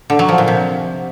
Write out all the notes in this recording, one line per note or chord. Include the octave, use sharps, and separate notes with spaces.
D3
F#3
F3
A#2
C3